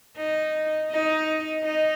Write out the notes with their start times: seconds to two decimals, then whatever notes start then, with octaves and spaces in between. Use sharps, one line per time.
0.17 D#4
0.91 D#4
1.64 D#4